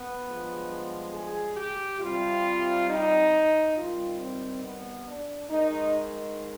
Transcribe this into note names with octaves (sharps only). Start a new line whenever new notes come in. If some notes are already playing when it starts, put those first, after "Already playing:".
Already playing: B3
G2 F3 G#3
G#4
G4
C3 G3 F4
D#4
C3 D#3 G3 F4
C4
B3
D4
G#2 D#3 G#3 D#4